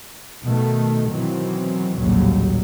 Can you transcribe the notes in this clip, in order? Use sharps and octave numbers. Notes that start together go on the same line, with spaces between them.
B2 D#3 A3
B2 D#3 E3 F#3 C4
A#1 D#2 A2 C#3 F#3 G3